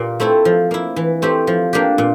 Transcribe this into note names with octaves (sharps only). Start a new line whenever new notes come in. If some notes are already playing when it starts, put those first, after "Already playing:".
Already playing: A#2 G4 A#4
A3 C4 E4 A4
F3
A#3 E4
E3
A3 C4 G4
F3
A#3 D4 G4
A#2